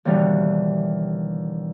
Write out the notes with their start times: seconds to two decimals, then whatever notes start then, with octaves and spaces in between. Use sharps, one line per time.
0.05 D#2 B2 D3 E3 G3